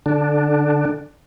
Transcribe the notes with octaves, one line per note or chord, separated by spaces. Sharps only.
D3 D4